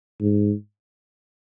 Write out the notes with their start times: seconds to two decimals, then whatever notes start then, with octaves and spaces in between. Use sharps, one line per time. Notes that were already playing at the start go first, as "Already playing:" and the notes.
0.21 G#2